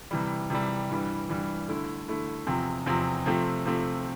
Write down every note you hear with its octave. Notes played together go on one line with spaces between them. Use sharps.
C3 E3 G3
C3 E3 G3
G2 E3 G3
G2 E3 G3
D3 A3 E4
D3 A3 E4
E2 C3 F3 C4
E2 C3 F3 C4
C3 F3 A3 C4
C3 F3 A3 C4